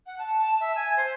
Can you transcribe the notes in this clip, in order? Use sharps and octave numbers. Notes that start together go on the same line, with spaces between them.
F#5
A5
A5
E5
G#5
C5